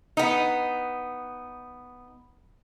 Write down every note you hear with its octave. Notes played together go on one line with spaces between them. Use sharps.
B3 D#4